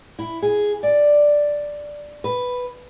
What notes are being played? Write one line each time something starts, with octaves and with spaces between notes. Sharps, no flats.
E4
G#4
D5
B4